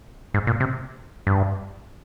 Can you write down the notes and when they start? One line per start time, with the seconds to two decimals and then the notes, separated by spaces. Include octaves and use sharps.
0.34 G#2
0.47 A#2
0.60 C3
1.27 G2